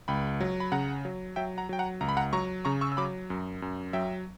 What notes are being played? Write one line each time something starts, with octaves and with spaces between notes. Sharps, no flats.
C#2 G5 B5
F#3
B5
C#3 F#5 A#5
F#3
F#3 E5 G5
F#5 A#5
F#3 G5
F#5 A#5
C#2 A#5
B5
F#5 A#5
F#3 A#5 C#6
C#3 A#5 C#6
C#6 E6
E6
F#3 B5 D6
F#2
F#2
F#3 E5 G5